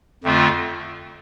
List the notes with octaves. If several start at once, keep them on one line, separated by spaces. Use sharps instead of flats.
F2 D3 A3 C4 F4